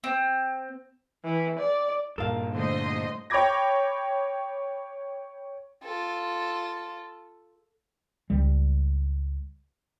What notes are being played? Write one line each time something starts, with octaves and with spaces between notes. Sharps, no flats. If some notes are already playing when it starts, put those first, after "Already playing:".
C4
E3
D5
G2 A#2 A4 A#4 F5
D3 A3 C5 D#5 C6
C#5 G5 B5 D6 G#6 A#6
F4 A4
C#2 G3